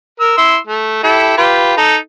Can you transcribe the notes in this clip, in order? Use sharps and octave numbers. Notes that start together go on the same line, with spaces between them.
A#4 E6
E4 C6 E6
A3
E4 G4 A4
F4 G4 B4
D#4 A4